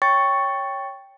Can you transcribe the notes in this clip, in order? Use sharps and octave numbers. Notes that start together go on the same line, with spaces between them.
C#5 G5 C#6 A6 C#7